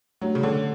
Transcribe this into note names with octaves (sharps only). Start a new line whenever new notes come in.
F#3 A3 D4 G4
C#3
D3